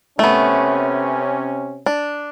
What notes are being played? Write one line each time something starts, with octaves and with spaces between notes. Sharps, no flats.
C3 A3 B3 C#4
D4